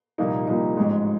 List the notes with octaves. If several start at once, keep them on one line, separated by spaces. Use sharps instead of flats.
C2 A#2 F3 A#3 D#4
C2 A#2 F3 A#3 D#4
A1 G#2 F3 G#3